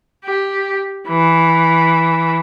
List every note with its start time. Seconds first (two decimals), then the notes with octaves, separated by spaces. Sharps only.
0.24 G4
1.08 E3